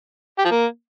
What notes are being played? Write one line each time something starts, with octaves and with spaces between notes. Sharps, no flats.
G4
F3
A#3